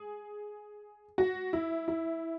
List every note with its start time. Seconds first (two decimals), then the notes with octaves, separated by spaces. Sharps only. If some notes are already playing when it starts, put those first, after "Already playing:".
Already playing: G#4
1.18 F#4
1.53 E4
1.88 E4